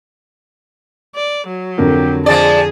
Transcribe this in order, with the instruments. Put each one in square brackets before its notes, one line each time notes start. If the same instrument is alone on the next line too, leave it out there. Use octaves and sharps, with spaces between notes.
[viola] D5
F#3
[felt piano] F2 D3 A#4 [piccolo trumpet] G4
[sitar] F3 G#3 D5 [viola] G#4 [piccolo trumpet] A5